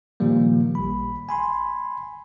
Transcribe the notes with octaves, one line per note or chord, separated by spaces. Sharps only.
A#2 D#3 F3 G3 A#3
A1 B5
G#5 B5 C6